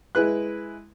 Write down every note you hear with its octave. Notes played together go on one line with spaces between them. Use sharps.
G#3 E4 B4 F#6